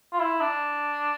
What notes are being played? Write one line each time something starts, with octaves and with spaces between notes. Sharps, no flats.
F4
E4
D4